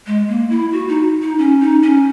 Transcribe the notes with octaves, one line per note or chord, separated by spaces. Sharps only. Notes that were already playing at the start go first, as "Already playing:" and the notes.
G#3
A#3
E4
F#4
D#4
D#4
C#4
D#4
C#4